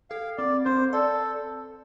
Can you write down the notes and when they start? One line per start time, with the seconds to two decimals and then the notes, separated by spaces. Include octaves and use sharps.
0.10 A4 F5
0.38 C4 D5
0.65 C4 C5
0.93 A4 D5